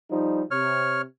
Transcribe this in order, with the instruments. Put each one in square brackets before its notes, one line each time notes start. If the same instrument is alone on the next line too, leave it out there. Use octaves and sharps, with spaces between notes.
[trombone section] F3 G3 D#4
[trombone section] C3 [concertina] C#5 F6